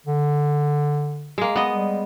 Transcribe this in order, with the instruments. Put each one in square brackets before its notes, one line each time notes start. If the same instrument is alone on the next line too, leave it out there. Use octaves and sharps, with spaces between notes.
[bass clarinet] D3
[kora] G#3 A#3
B3 D#5
[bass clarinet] G3